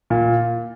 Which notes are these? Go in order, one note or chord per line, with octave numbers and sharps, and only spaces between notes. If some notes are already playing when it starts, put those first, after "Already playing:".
A#2